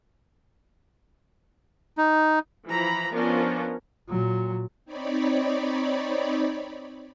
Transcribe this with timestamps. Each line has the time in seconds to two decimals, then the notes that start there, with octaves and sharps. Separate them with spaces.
1.98 D#4
2.67 E3 F3 A#5 B5
3.12 F3 B3 C#4 D4 F4 A#4
4.09 A#2 F#3
4.85 C4 D#4 C#5 D5 B5